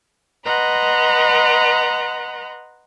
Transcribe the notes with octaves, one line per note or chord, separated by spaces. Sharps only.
B4 D#5 F#5 A#5 C6